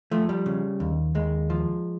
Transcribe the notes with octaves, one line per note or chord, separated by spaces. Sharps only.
F3 A3
G3
C#3
D#2
D#2 G#3
F3